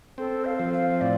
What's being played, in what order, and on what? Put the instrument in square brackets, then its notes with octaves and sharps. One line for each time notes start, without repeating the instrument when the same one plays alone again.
[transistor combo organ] C4 [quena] A4
[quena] F5
[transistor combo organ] F3
[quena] F5
[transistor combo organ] A2 [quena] D5